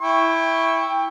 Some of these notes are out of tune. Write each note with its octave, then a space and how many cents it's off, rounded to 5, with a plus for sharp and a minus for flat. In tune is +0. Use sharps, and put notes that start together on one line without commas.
E4 +0 G5 +20 C#6 +0